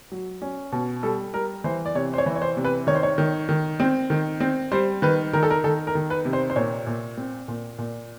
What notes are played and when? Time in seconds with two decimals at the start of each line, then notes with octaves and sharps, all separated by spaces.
0.12 F#3
0.42 C#4
0.72 B2
1.03 G3 A4
1.33 G3 A#4
1.64 E3 C5
1.86 D5
1.95 C3 C#5
2.14 C5
2.18 C#5
2.26 E3
2.35 C#5
2.42 C5
2.57 C3
2.65 B4
2.87 D#3 C#5
2.95 C5
3.03 C#5
3.18 D#3
3.49 D#3
3.80 C4
4.10 D#3
4.40 C4
4.72 G3 C5
5.02 D#3 B4
5.33 D#3 A#4
5.43 A4
5.51 A#4
5.64 D#3 A4
5.87 A#4
5.95 D#3
6.10 B4
6.25 C3
6.33 C5
6.50 C5
6.56 A#2 C#5
6.87 A#2
7.17 C4
7.48 A#2
7.78 A#2